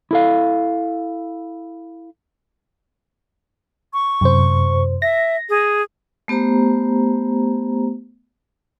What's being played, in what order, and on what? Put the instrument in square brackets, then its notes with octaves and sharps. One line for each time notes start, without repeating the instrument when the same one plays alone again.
[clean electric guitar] E4 A4 F5
[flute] C#6
[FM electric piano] F#2 C3 C5
[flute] E5 [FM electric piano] A#6
[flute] G#4
[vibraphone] A3 B3 G4 C5 A#5